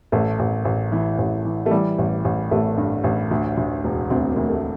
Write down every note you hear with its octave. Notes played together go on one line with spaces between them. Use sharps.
A1 A3
A1
A1
E3
A1
E3
A3
E3 G3
A1
A1
A1 A3
G2
A1
D2
D2
E1
D2 C4
A#3
D2
A3